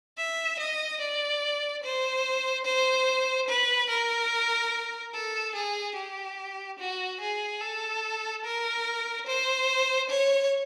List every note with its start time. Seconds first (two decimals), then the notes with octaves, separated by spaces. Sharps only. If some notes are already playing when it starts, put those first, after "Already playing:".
0.18 E5
0.59 D#5
1.01 D5
1.83 C5
2.65 C5
3.48 B4
3.90 A#4
5.14 A4
5.55 G#4
5.96 G4
6.79 F#4
7.21 G#4
7.61 A4
8.45 A#4
9.27 C5
10.09 C#5